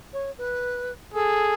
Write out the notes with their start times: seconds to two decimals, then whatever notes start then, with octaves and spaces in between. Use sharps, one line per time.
0.13 C#5
0.38 B4
1.14 G#4 A4